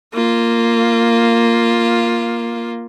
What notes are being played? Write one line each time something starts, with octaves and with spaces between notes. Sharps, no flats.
A#3 F4